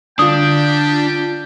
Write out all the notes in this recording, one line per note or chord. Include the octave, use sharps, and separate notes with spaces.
D3 G3 D4 F4 G5 D#6